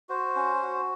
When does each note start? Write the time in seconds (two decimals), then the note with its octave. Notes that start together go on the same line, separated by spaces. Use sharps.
0.09 F#4 C5
0.36 C#4
0.62 F#4